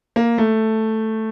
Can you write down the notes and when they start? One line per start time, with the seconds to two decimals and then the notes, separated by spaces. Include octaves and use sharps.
0.16 A#3
0.38 A3